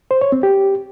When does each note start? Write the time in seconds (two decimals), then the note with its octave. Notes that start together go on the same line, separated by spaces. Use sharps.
0.11 C5
0.22 C#5
0.32 C4
0.43 G4